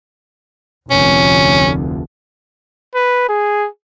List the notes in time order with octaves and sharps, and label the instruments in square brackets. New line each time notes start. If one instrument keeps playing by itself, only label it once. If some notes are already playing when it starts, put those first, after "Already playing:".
[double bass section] F1 D2 [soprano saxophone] C#4
[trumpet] B4
G#4